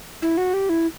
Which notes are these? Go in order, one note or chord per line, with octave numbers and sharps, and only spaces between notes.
E4
F#4
G4
E4